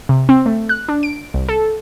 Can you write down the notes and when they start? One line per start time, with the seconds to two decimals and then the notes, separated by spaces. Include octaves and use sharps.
0.09 C3
0.29 C4
0.46 A3
0.69 F#6
0.88 D4
1.03 D7
1.34 C2
1.49 A4